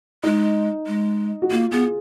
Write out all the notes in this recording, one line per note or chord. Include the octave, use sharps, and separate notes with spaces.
G#3 D#4
G#3
F#4
A#3 F4
B3 G#4